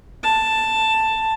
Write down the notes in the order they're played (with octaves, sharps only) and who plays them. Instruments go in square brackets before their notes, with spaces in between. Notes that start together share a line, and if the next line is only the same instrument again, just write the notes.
[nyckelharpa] A5